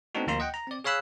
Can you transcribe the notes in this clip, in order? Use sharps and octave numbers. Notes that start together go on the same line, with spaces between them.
A3 B3 C4 D4 D#4 F#4
D2 F3 A#3 F4 A#5 C6
D#5 F#5 G5
A#5
C4 D5
G#4 C#5 F5 B5 E6 F#6